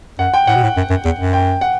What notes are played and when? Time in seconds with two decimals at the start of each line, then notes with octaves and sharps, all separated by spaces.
0.19 F#2 F#5
0.34 G5
0.47 A2 F#5
0.55 B2
0.63 A2
0.77 F#2
0.90 F#2
1.05 E2
1.19 F#2
1.33 G5
1.61 F#5